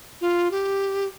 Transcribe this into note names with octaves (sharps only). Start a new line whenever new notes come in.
F4
G4